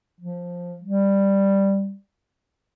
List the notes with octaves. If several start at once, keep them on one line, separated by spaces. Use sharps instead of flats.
F3
G3